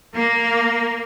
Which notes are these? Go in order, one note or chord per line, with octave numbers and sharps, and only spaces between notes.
A#3